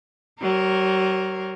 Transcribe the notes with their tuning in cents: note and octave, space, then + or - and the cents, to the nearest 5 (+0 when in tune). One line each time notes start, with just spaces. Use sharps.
F#3 +45 A#4 +0 C#5 -30